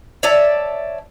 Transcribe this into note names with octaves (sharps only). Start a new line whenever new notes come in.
C#5 D5 E5 A5